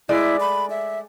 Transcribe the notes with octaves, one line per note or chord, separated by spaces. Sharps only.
G#3 A3 E4 D5
B5
E5